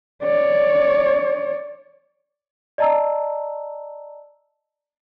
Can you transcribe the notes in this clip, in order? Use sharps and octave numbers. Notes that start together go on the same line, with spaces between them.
C#5 D5
D5 D#5 A5 A#5 E6